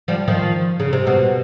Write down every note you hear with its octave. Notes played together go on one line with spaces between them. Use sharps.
F3 G3
D#3 F3
C#3
C3
B2